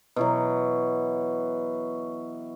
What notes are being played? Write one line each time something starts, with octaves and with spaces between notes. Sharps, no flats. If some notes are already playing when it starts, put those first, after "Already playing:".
B2 E3 F#3